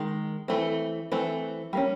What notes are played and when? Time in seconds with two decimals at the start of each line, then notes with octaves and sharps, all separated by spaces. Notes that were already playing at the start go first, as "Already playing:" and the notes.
Already playing: D#3 G#3
0.48 E3 A3 C4
1.12 E3 A3 C4
1.73 G3 A#3 C#4